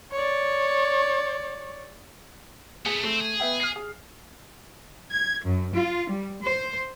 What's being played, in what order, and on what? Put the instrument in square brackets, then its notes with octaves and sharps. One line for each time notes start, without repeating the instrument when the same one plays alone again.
[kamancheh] C#5 D5
[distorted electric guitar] A3 B3 [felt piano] G#4
[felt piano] A3 [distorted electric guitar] C4
[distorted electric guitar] G#4
[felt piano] B3 E5 G5
F6 C7
G#4
[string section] G#6
F#2
F4
G3
C5